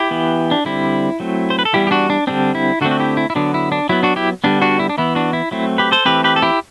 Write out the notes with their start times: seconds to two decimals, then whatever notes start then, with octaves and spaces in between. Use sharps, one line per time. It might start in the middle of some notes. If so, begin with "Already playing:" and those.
Already playing: E4 G4
0.11 E3 B3
0.51 D4
0.65 D3 G3 C4 E4
1.20 F#3 A3 C4
1.50 C5
1.59 B4
1.65 A4
1.73 E3 G3 B3 E4 G4
1.87 G4
1.91 D4 F#4
2.10 D4
2.27 D3 G3 C4 D4
2.55 E4
2.81 D3 D4 F#4
2.84 A3 C4
2.91 F#4
3.00 E4 G4
3.17 E4
3.30 E4
3.35 D3 F#3 B3 D4
3.54 E4
3.72 D4
3.89 F#3 B3 E4
4.03 D4 F#4
4.16 E4 G4
4.44 D3 G3 B3 D4
4.62 D4 F#4
4.79 E4
4.89 D4
4.98 E3 B3 E4
5.15 D4 F#4
5.33 E4
5.51 F#3 A3 C4 E4
5.78 G4 B4
5.92 A4 C5
6.05 E3 A3 C4 G4 B4
6.24 G4 B4
6.36 A4
6.42 E4 G4